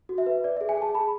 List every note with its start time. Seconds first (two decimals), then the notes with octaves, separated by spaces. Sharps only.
0.09 F#4
0.18 E5
0.26 B4
0.44 D5
0.57 G#4 E5
0.69 G#5
0.77 G#4 A5
0.95 G#4 B5